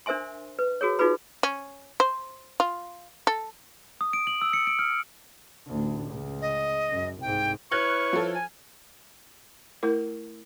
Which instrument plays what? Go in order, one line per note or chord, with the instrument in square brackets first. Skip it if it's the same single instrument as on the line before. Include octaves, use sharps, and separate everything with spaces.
[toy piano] D4 A#4 C5 E5 G#5 C6
B4
F#4 G#4 A#4 C#5
D#4 F4 F#4 G#4 B4 B5
[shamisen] C#4
C5
F4
A4
[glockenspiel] D#6
D7
F#7
E6
C#7
D7
F6
[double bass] A1 D2
C#2
[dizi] D#5
[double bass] F#2
[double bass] C2 G#2 [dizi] G5
[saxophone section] E4 B4 C#5 [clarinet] C#6 [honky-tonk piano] F6 F#6 G#6
[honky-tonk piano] F3 A4
[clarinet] G#5
[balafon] A3 E4 A#4